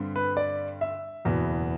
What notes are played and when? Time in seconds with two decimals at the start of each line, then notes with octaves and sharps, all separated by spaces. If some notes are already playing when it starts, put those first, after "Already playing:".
Already playing: G2 D3 G3 C4
0.16 B4
0.37 D5
0.81 E5
1.25 F#1 E2 B2